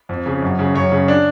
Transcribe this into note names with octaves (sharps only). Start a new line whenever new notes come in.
F2
C#3
F#2
C#3
F#2 C#5
C#3
D4